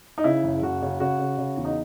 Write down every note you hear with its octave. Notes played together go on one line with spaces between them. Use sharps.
D#4
C#3 E4
F#1
F#1 F#4
C#3
C#3 F#4
C#3
C#3
E2
D#4